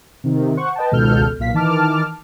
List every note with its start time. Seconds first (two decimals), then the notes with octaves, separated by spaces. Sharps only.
0.24 C3 D#3
0.57 C5 F#5 C#6
0.76 B4 D#5 G5 A5
0.91 G#1 C#2 B2 A4 F6 G6
1.39 B1 A#2 F5 B6
1.54 D#3 E3 A5 D6 F6